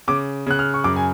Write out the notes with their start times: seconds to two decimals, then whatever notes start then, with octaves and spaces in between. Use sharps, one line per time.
0.08 C#3 D6
0.47 C#3 F#6
0.59 F6
0.74 C#6
0.84 F#2 D6
0.96 G#5